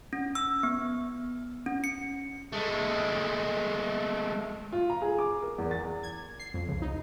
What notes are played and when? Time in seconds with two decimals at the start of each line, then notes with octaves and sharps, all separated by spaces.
0.13 C#4
0.35 E6
0.63 B3
1.66 C#4
1.84 C#7
2.53 G#3 A3
4.72 F4
4.90 A#5
5.02 G#4
5.19 D6
5.42 A#4
5.58 E2
5.71 A6
6.03 G#6
6.39 C7
6.54 F2
6.67 C#2
6.82 D#4